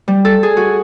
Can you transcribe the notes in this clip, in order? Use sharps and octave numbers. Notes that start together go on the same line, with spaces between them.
G3
A4
G#4
F#4